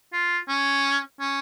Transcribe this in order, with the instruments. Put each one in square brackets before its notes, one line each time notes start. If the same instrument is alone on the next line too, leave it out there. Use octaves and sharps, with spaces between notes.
[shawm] F4
C#4
C#4